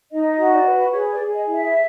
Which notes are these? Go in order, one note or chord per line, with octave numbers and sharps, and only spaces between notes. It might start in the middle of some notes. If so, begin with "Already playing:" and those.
D#4 D#5
F#4
D5
B4
G#4 C#5
D5
G#4
D#5
E4
E5